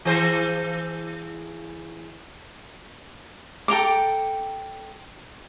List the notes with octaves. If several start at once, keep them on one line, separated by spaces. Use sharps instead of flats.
E3 G#4 C5
A4 G5 A#5 D6